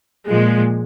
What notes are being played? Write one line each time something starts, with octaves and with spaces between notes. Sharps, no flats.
A#2 F3 G#3